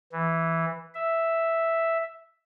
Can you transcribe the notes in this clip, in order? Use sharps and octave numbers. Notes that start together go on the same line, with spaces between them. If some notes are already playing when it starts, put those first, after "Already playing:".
E3
E5